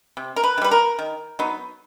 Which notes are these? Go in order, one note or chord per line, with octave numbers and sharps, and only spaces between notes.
C3
A#4
B4
D#3
G3 B4
A#4
D#3
F#3 B3 D#4